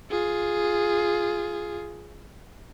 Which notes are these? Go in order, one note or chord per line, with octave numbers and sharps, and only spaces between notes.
F4 G#4